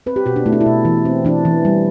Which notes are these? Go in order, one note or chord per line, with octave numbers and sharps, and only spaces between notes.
C4 B4
G4
B2 F#4
D4
A3 E4
D4
E4
B2
E3
C4
E3 D4
E3
G3